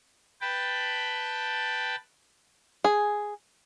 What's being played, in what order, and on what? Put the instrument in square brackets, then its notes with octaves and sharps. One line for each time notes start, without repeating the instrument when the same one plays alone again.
[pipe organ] B4 G5 A5 B5
[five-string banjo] G#4